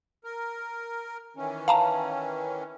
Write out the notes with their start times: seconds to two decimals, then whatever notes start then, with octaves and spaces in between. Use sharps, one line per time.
0.24 A#4
1.37 D#3 E3 C#4
1.68 F5 A5 A#5